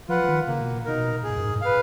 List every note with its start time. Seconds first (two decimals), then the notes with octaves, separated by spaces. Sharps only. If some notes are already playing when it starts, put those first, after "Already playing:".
0.09 F3 F4 B4 F#5
0.24 F3
0.29 D#3
0.47 C#3 A#3
0.61 B2
0.74 A#2
0.85 B2 D#4 A#4
1.23 A#2 G#4
1.30 G#2
1.37 F#2
1.45 G#2
1.56 G#2
1.61 B4 F5